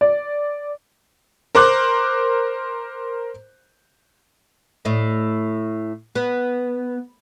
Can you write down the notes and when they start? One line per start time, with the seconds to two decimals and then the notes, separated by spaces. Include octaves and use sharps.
0.01 D5
1.55 A#4 C5 D6 F#6
4.85 A2 D#5
6.15 B3